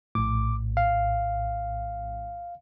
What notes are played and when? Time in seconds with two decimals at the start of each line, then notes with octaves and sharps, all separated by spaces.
0.15 A#1 A2 D6
0.77 F5